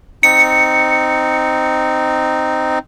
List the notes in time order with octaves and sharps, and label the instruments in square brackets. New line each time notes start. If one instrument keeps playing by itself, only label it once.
[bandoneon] C4 D#4 [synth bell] C#7